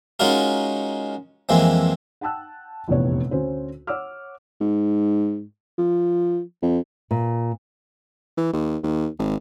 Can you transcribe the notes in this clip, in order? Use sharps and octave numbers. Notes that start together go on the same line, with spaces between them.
G#3 C#4 D#4 F4 F#4 A#4
F2 E3 G#3 A#3 C4
F#5 G5 A5 E6 F#6
F1 A#1 E2 C3 B3 C#5
D2 C#4 C5
C#5 F#5 D6 E6 F6
G#2
F3
F2
A#2
E3
D#2
D#2
G#1